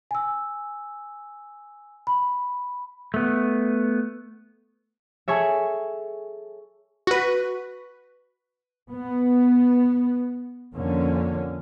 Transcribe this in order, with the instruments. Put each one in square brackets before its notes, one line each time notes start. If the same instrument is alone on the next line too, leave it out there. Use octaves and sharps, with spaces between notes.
[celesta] G#5 E6
B5
[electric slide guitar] A3 B3
[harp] G#4 A4 C#5 E5
[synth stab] F#4 B4
[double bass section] B3
F2 D3 A#3 C#4